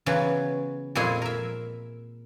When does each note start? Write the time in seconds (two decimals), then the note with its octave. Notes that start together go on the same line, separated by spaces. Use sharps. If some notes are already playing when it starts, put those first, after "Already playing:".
0.06 C#3 E3 F#3 B3 C#4
0.95 F2 A#2 G#3 E4 G#4 C6
1.22 A#4 E5